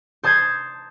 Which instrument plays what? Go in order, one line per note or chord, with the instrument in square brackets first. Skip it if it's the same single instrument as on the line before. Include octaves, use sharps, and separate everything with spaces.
[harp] C5 A5 D#6 G6 G#6 C7